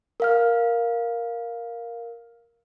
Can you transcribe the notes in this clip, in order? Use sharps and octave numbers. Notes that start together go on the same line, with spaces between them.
A#4 F5 F6